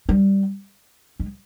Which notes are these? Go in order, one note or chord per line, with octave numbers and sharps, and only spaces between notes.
G3
G#3